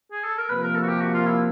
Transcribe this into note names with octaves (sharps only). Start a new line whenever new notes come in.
G#4
A4
A#4
C3 F3 A#3 B4
A#4
A4
F#4
G4
F#4
F4
E4